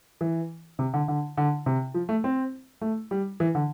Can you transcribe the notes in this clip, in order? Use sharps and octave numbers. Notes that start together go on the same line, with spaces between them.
E3
C3
D3
D3
D3
C3
F3
A3
C4
A3
G3
E3
D3